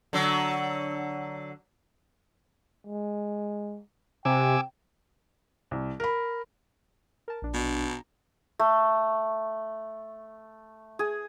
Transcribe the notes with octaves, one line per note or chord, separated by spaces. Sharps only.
D3 F#3
G#3
C3 G5 G#5 D6 E6
C2
A#4 B5
A#4 A5
A#1 D4
B2
A#5
A3
G#4